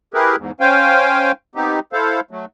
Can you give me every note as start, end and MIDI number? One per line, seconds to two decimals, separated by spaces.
0.14 0.36 64
0.14 0.36 67
0.14 0.36 68
0.14 0.36 70
0.14 0.36 71
0.37 0.51 40
0.37 0.51 44
0.60 1.32 61
0.60 1.32 72
0.60 1.32 77
0.60 1.32 79
0.60 1.32 80
1.55 1.80 59
1.55 1.80 60
1.55 1.80 63
1.55 1.80 67
1.93 2.20 64
1.93 2.20 69
1.93 2.20 72
1.93 2.20 77
2.31 2.45 54
2.31 2.45 57